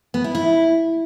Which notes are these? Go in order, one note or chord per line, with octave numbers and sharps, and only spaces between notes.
B3
E4
E4